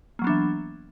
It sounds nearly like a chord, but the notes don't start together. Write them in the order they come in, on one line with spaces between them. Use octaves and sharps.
A#3 F#3 B3 D4 E3